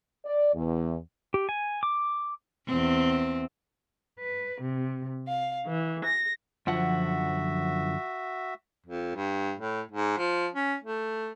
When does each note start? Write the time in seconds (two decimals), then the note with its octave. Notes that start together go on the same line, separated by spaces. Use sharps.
0.24 D5
0.54 E2
1.34 G4
1.49 G#5
1.83 D6
2.67 E2 C4
4.19 B4
4.61 C3
5.28 F5
5.66 E3
6.05 A#6
6.67 F#2 D3 F3 F#4 E5 F#5
8.86 F2
9.15 G2
9.58 A2
9.91 G#2
10.18 F3
10.54 C#4
10.84 A3